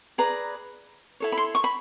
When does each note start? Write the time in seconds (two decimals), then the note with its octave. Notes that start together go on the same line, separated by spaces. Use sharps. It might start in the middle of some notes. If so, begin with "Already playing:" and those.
0.18 G#4 B4 D5 A#5
1.20 E4 A4 C#5
1.32 B5
1.38 C6
1.55 C#6
1.64 B5